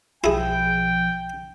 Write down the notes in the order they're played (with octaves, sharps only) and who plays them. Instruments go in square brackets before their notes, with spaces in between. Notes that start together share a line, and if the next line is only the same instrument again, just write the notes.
[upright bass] B1 F3 [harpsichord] E4 G#4 [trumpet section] G5